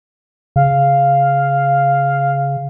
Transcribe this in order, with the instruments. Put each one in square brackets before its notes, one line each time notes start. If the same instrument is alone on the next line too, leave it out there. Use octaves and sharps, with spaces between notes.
[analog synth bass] C#3 [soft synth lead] F5